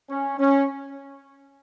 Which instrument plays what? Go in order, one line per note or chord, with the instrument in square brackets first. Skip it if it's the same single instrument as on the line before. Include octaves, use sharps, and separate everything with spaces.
[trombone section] C#4
C#4